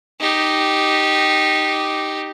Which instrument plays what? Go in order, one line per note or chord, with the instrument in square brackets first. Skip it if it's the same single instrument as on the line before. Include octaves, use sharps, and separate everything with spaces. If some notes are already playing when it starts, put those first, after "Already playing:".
[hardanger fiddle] D#4 G4